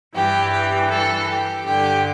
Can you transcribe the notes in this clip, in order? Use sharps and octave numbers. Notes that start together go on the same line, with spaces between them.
G2 E3 G4
G4
A4
G4
G2 D3 G4